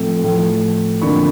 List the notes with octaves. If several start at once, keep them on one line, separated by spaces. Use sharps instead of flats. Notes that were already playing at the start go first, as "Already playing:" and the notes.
Already playing: A2 F3 A3 C4
A2 F3 A3
F2 D3 F3 A#3 B5 C#6